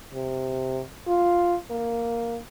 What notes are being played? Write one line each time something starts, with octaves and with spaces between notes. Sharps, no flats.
C3
F4
A#3